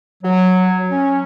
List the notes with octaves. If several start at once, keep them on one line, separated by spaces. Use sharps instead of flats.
F#3
C#4